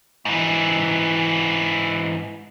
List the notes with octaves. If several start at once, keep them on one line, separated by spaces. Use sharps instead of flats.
G#2 E3